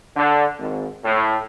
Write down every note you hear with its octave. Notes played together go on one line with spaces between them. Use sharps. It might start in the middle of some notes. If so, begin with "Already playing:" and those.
D3
G#1
A2